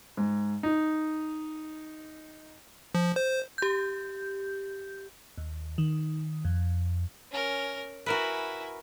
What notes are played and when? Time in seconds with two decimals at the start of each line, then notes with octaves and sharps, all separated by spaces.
0.17 G#2
0.63 D#4
2.95 F3
3.16 C5
3.58 G4 G6
5.38 D#2
5.78 D#3
6.45 F2
7.31 C#4 A#4
8.06 E4 F#4 A#4 B4 G#5